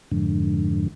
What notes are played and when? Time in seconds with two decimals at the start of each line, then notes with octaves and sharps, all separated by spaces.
0.11 F2 G#2 D3